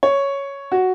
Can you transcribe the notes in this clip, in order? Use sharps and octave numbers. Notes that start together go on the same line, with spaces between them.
C#5
F#4